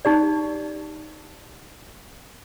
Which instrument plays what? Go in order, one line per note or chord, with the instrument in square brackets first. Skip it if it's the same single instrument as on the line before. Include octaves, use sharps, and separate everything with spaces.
[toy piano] D#4 G4 D5